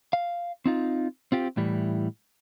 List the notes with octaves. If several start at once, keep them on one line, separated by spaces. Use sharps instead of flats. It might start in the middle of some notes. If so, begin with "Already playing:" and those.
F5
C4 D#4 F4
C4 F4 G4
A2 E3 G3